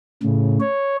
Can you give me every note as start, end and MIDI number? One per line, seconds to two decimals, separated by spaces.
0.23 0.58 45
0.23 0.58 49
0.60 0.96 73